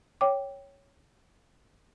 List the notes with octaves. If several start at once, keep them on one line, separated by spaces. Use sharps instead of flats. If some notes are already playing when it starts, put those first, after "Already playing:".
C#5 G5 D6